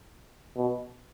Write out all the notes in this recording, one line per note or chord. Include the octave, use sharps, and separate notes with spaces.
B2